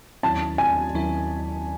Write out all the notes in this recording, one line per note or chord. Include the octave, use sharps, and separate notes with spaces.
D#2 D#3 F#3 C#4 E4 A5
G#5
D#2 D#3 F#3 C#4 E4